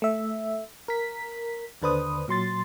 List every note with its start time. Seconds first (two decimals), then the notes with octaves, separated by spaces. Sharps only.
0.02 A3 E5
0.88 A#4 B6
1.82 D#2 D3 D4 B4 C5 D#6
2.28 A#2 F#3 C6 A6